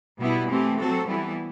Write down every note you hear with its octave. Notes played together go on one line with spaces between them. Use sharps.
B2 G3 B3 E4
E3 A3 C4 G4
F#3 C4 F#4 A4
E3 G3 B3 E4